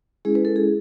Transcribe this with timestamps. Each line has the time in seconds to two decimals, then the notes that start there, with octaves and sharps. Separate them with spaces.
0.25 G#3 C#4 E4 G#4
0.35 B4
0.45 A4
0.56 G#4